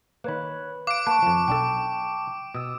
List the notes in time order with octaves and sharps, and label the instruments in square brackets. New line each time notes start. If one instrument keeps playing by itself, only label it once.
[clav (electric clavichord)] D#3 A#3 [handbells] B4 C#5 B5
[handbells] F5 F#6 C7 [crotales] D6 D7
[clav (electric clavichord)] A#3 B4 F#5 [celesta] A5 C#6
[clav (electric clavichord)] F2 F3
[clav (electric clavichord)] B1 D4 A4 [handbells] G5
[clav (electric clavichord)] B2 [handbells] D#6 E6